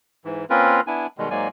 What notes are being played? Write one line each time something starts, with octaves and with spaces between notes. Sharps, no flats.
G#2 E3
A#3 C4 C#4 F4 A#4 B4
B3 D4 E4 G#5
B2 D#3 G3 G#3
G#2 F#3 G#3 A#3 D5 G#5